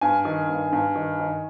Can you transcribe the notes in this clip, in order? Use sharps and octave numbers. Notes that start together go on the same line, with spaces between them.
G2 G#5
D#3
G2
G2
D#3
D#3